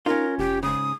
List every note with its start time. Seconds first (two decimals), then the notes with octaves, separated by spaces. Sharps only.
0.06 C#4 D#4 F4 A#4
0.39 F1 G4
0.63 G#2 C#3 D#6